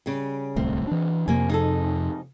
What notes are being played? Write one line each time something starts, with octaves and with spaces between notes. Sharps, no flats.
C#3 G3
D1 C2 A3 C4
E3 D4
F2 C3 A#3 G#5
D#4 G#4 A4